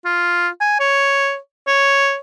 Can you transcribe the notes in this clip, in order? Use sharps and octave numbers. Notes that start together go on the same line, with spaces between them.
F4
G#5
C#5
C#5